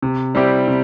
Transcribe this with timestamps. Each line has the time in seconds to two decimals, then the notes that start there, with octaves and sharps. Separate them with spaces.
0.02 C3
0.35 G3 C4 E4 G4
0.68 C3